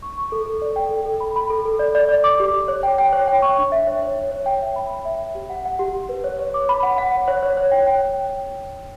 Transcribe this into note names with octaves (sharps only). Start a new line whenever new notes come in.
C#6
C#6
A4
A4
D5
G5
A4
A4
B5
B5
A4
A4
D5
D5
D5
D6
G4
D6
C#5
G5
G5
C#5
G5
C#6
D4
E5
C#5
C#5
E5
C#5
G5
E5
B5
B5
E5
E5
G4
F#5
F#5
G4
G4
B4
C#5
C#5
D6
B5
F#5
F#5
C#5
C#5
C#5
C#5
G5
G5